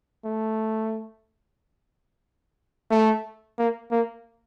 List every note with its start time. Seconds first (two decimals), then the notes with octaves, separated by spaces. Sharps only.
0.25 A3
2.91 A3
3.58 A#3
3.91 A#3